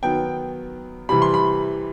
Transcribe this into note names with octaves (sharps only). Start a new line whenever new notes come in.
D#3 F#3 B3 G5
C3 E3 G3 B5
C6
B5